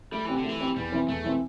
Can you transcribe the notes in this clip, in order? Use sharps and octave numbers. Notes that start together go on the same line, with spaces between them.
G3 A3
E3 C4 G4
D3
E3 A3
C4 G4
E2 G3
E3 C4
E2 A3
E3 C4